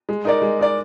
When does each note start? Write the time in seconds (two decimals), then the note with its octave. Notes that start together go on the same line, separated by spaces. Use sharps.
0.09 G#3
0.25 D#4 A#4 D5
0.42 G#3
0.59 D#4 A#4 D5